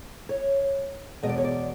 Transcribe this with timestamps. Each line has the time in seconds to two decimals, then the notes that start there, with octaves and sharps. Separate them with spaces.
0.29 C#5
1.23 E2 B2 G#3 D#5
1.29 D5
1.38 C#5
1.44 D5